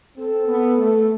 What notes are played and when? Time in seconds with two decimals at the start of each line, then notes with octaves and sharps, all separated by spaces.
0.17 C4 A4
0.47 B3
0.77 A3